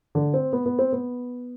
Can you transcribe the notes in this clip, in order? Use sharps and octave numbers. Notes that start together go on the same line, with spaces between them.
D3
C4
B3
B3
C4
B3